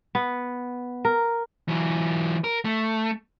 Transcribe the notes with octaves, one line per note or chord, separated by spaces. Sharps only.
B3
A#4
E3 F#3
A#4
A3